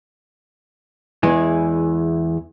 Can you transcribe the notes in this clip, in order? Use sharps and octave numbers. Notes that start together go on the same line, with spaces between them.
E2 E3 G#3 G#4